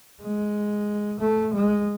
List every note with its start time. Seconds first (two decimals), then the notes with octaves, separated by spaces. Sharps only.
0.22 G#3
1.20 A3
1.53 G#3